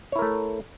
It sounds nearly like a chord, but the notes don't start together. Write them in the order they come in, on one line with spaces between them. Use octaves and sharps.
C#5 E4 A#4 A3